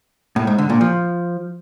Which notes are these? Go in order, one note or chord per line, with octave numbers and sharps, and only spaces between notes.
A2
G#2
D3
A#2
F3